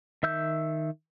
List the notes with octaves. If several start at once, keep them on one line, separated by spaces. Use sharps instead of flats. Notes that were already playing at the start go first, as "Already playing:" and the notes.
D#3 E5 E6 G6